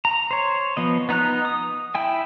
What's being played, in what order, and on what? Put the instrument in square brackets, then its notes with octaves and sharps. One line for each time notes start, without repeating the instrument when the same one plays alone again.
[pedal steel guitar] A#5
C5 C#5
F3 B3 D#5
B3 D#4 A#5 F#6
D#6
E4 G5 G#5